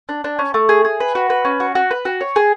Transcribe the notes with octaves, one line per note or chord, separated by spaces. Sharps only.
D4
D4
C#4
A3
G#4
G#4
B4
F#4
B4
C#4
F#4
F#4
B4
F#4
C#5
G#4